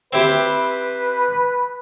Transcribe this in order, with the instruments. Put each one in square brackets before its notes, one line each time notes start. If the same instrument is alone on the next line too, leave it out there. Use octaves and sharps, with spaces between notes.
[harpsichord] C4 E4 G4 [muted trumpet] B4